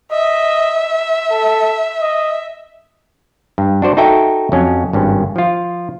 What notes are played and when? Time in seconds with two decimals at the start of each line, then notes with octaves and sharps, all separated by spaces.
0.11 D#5 E5
1.31 A4
2.01 D#5
3.58 G2
3.82 D4 F#4 C5 D5
3.97 D#4 F#4 A4 E5 G5
4.52 F2 F#3 C#4
4.93 G#1 G2 C#4
5.36 F3 F4